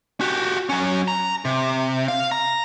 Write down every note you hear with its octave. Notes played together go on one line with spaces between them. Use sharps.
F#4 G4
F#3 C#4
A#5
C3
F5
A#5